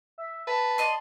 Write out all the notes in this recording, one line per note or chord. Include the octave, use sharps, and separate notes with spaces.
E5
B4 A5
D5 D#5 C6